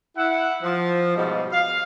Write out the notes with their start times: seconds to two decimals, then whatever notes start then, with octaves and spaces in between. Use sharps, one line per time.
0.17 E4 F#5
0.62 F3
1.16 G#2 B2 F3 G3
1.52 F5